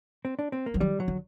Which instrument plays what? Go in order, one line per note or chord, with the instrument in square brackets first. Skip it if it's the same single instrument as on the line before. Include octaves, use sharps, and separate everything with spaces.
[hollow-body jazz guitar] C4
D4
C4
A#3
[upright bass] F#3
[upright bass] D#3 [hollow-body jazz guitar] G3
[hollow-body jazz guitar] F#3
[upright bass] D3